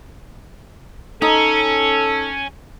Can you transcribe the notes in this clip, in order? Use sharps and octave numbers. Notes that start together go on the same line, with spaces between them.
C#4 D#4 A4